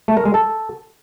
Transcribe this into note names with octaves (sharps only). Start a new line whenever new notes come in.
A3
A#4
G#3
A4